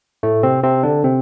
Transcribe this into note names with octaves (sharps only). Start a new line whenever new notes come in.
A2 A3
C3 C4
C3 C4
D3 D4
C3 C4